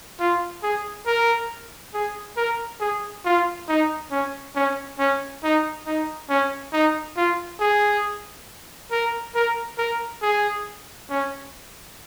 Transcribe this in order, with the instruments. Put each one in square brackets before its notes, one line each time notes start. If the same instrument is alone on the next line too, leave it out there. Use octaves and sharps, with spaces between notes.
[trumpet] F4
G#4
A#4
G#4
A#4
G#4
F4
D#4
C#4
C#4
C#4
D#4
D#4
C#4
D#4
F4
G#4
A#4
A#4
A#4
G#4
C#4